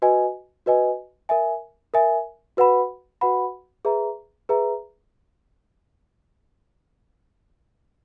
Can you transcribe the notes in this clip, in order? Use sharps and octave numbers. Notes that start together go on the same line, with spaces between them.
F#4 B4 D#5 G#5
F#4 B4 D#5 G#5
A#4 E5 G#5
A#4 E5 G#5
F#4 B4 F#5 B5
F#4 B4 F#5 B5
G#4 B4 E5 A#5
G#4 B4 E5 A#5